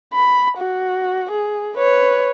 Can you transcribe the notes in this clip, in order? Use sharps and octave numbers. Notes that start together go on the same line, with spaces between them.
B5
F#4
G#4
B4 C#5